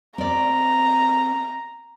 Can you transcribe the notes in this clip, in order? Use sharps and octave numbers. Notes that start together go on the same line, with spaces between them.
C4 D5 A#5